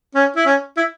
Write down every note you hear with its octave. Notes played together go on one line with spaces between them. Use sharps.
C#4
E4
C#4
E4